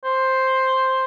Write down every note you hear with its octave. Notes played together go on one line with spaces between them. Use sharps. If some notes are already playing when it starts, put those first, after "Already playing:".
C5